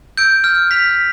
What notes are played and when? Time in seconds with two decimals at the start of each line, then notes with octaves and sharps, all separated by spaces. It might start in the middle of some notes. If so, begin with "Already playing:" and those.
0.17 E6 G6 D7
0.44 F6
0.71 B6 F7